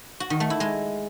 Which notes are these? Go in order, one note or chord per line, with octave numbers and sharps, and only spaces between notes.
F#4
D#3
A3
E4
G#3